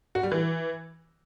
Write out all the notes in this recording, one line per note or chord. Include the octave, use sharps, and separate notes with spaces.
F#4
G3
E3